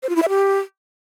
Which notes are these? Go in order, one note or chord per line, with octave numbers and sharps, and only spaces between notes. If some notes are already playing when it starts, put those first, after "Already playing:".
C5
F4
E4
E5
G4